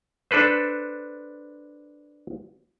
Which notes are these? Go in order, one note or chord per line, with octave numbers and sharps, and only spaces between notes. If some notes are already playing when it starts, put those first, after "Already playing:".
D4 A4 B4 C5